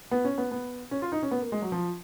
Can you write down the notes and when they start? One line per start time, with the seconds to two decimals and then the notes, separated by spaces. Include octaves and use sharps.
0.11 B3
0.24 C#4
0.38 B3
0.52 B3
0.91 C#4
1.02 F4
1.12 D#4
1.22 C#4
1.31 B3
1.42 A#3
1.52 G#3
1.62 F#3
1.72 F3